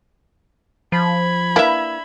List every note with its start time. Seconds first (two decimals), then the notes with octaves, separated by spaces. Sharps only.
0.92 F3 B5 G#6
1.56 A#3 D4 E4 B4 E5